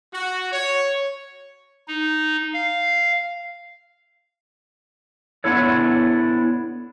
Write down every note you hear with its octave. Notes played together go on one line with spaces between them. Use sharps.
F#4
C#5
D#4
F5
B3 D4 E4 A4 C#5